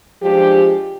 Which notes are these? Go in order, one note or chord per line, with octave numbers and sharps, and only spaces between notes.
F3 G#3 D4 G4